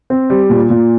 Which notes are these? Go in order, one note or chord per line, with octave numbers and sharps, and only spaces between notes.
C4
G3
A#2
A#2